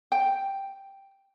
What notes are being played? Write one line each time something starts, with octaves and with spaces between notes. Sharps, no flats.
G5